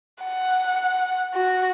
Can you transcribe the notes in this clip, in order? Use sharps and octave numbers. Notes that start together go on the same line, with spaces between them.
F#5
F#4